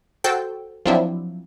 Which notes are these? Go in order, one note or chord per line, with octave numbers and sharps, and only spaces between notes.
F#4 A4 C5 G5
F3 F#3 C4 D4 E4